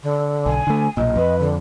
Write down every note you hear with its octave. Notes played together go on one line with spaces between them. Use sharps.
D3
B1 G#5
D3 A3
B1 A#2 D#5
F2 B4
D3